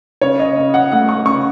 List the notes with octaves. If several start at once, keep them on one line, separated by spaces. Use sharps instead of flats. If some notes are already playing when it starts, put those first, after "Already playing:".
C#3 C#5
D#5
C#3
F#5
A3 F#5
C#6
C#3 C#6